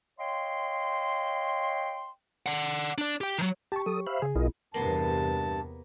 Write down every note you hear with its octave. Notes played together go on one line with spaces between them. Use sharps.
C#5 D#5 F5 G5 C6
D5 F#5
D4 D5
G4 G5
D#3 F#3
G4 A5 C#6
F#3 A4 D#6
C5 E5 F5 B5
C#3 G#4
B1 E4 F4 A#4 D#5
E2 G2 C3 A#3 B3 A5 C6